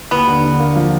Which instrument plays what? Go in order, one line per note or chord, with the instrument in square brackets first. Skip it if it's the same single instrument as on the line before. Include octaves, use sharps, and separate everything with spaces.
[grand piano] D#2 [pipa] B3
[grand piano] D3
D3
A#3
F3